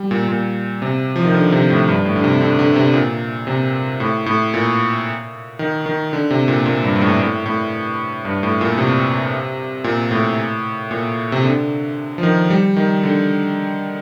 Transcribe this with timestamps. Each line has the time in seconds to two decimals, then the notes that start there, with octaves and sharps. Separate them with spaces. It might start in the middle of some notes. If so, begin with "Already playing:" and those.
Already playing: G3
0.11 A#2
0.28 A#2
0.82 C3
1.16 F3
1.25 D#3
1.34 D3
1.52 C3
1.70 A2
1.88 G2
2.05 A2
2.16 D3
2.24 C3
2.41 D3
2.59 D3
2.76 C3
2.94 A#2
3.47 C3
4.00 A2
4.26 A2
4.54 A#2
5.59 D#3
5.86 D#3
6.13 D3
6.30 C3
6.48 A#2
6.66 A#2
6.83 G2
6.95 G2
7.01 A2
7.19 A2
7.46 A2
8.25 G2
8.43 A2
8.61 A#2
8.78 C3
9.84 A#2
10.11 A2
10.91 A#2
11.32 C3
11.44 D3
12.18 F3
12.23 D#3
12.50 G3
12.76 D#3
13.03 D3